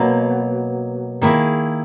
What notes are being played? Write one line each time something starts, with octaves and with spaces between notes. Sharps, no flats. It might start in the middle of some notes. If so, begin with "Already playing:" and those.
Already playing: B2 F#3 A#3
D#3 A#3 E4 G#4